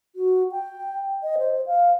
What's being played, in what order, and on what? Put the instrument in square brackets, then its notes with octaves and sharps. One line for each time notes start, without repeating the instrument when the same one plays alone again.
[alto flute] F#4
G5
D#5
C5
F5